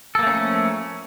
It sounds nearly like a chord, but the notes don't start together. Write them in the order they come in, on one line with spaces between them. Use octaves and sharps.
A4 A#3 A3 C#4 F3